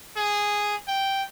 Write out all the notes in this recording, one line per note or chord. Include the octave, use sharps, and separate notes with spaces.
G#4
G5